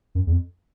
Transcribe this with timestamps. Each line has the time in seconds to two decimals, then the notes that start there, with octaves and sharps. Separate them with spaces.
0.15 F#2
0.27 E2
0.32 F2